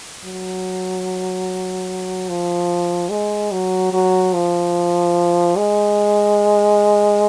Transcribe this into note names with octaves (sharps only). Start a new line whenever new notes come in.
F#3
F3
G#3
F#3
F#3
F3
G#3